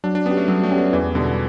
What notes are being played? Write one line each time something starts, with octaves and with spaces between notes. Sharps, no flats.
F#3 D4
D4
B3 C#4 G4
A3
F#3 G3
A3
C#4 G4
B3
E2 E3
B2 D3 G3 B3